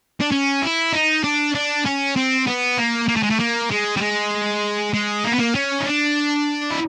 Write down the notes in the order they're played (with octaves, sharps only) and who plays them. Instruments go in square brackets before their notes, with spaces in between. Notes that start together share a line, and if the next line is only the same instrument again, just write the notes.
[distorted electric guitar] D4
C#4
E4
D#4
D4
D4
C#4
C4
B3
A#3
A#3
A3
G#3
A3
A#3
G#3
G3
G#3
G#3
A#3
B3
A#3
C#4
D#4
D4
E4